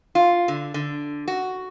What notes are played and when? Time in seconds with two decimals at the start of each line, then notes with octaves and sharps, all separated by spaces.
0.15 F4
0.48 D3
0.74 D3
1.28 F#4